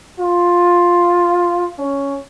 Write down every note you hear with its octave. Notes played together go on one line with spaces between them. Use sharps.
F4
C#4